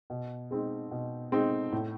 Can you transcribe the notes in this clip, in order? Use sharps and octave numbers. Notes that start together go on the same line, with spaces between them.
B2
G#3 C4 D#4
B2
G#3 C4 D#4
A2